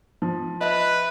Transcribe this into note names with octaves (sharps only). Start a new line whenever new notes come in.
F3
B4 D#5 E5 F#6